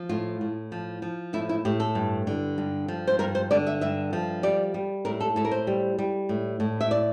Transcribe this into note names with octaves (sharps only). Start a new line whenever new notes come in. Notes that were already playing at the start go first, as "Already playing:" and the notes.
Already playing: F3
A2 F4
A2
F3
F3
A2 E4
E4
A2 G4
A4
G2
D3
G2
F3
C5
G2 A#4
C5
D3 D5
E5
G2 E5
F3
G3 D5
G3
A2 A#4
A4
A2 A4
A#4
C5
G3
G3
A2
A2
E5
D5